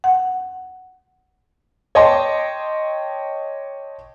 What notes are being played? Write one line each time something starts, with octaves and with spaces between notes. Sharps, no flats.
F#5
C#5 D#5 G5 A5 C6 D6